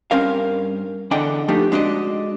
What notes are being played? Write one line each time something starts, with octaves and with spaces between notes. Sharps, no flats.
G2 C4 C#4 A#4 F5
E2 D3 D5 D#5 F#5 G5
F3 A3 B3 D4 D#4 G4
G#3 D4 F#4 D5 D#5